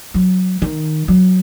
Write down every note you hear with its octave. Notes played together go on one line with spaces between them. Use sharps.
F#3
D#3
F#3